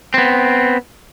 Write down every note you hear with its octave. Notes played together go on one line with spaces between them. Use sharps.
B3 C4